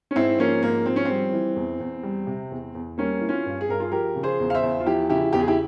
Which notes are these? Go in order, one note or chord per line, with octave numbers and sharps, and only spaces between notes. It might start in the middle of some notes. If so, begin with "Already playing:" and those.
C#4
G#2 C4 E4
F3 A#3 C#4
G#2 A#3
F3 C4
C#4
G3 C4
E3
E2
E2
G3
C3
E2
E2
G3 A#3 C#4
E3
C#4 F4
G2
G#4
G2 A#4
F4 G#4
F3 G4 A#4
C#3
G#4 C5
E2
F5
C5 E5
E2
F4
F3 E4 G4
C#3 E4 G4
E2 G4
G#4
E4 G4